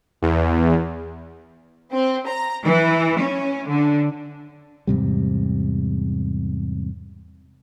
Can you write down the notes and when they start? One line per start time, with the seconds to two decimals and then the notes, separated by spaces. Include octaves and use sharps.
0.22 E2
1.92 C4
2.28 A#5
2.64 E3
3.20 C#4
3.67 D3
4.87 E2 G#2 C3 G3